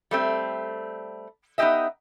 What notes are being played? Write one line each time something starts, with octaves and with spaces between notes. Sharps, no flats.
G3 A3 C4
B3 D#4 E4 G4 D#5 E5